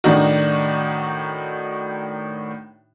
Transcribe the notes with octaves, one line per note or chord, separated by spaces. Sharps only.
A2 D#3 D4 D#4 F#4